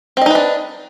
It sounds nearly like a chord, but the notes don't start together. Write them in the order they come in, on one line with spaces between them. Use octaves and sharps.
C4 D#5 D#4 B4 D4